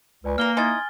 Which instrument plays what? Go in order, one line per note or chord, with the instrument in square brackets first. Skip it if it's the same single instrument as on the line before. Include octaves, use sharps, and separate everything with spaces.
[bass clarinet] C#2 [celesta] B4 D5 G#5
[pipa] E3 A#4 [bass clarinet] A#3 [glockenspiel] F6 G7
[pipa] D#4 E4 D#5 [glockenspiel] G#5 A6 [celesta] C6 D#6 G#6